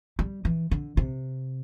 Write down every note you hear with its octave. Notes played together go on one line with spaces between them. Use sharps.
G3
E3
D3
C3